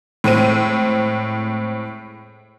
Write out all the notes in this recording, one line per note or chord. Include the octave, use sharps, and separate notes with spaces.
A2 G#3 C4 D#7